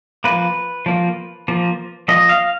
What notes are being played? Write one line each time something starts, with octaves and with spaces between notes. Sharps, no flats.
F3 A#3 B4
F3 A#3
F3 A#3
F3 A#3 D#5
F5